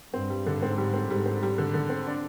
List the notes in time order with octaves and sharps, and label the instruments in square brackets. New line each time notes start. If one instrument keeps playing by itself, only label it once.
[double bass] G2 [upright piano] C4
[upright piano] G3
D3
[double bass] G#2 [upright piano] C4
[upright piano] G3
C4
[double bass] G#2 [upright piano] G3
[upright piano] C4
G3
D3
D3
C4
D4